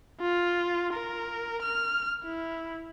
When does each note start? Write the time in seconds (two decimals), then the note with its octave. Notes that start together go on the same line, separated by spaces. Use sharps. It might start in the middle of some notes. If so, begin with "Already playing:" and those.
0.21 F4
0.93 A#4
1.62 F6
2.24 E4